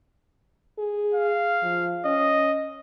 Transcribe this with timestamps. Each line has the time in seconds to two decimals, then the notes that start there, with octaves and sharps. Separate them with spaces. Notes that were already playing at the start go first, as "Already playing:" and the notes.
0.78 G#4
1.14 F5
1.63 F3
2.05 C#4 D#5